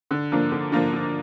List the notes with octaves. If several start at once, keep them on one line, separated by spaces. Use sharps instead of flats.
D3
F3 A#3 D4
D3
F3 A#3 D4
D3